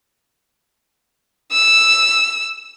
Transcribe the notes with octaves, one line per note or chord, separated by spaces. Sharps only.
E6